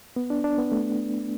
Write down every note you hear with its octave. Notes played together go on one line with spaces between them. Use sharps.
B3
D4
D4
B3
A3